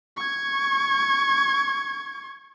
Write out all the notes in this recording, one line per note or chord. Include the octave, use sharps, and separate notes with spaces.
C#6 G#6